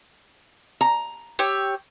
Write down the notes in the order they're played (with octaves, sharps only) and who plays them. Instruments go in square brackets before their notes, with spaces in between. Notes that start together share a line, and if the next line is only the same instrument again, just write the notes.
[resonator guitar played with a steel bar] A#5
[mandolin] G4 C#5 E6